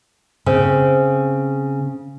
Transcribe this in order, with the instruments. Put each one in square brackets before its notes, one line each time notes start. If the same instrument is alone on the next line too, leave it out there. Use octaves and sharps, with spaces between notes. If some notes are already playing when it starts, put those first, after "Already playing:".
[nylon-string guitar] C#3 C4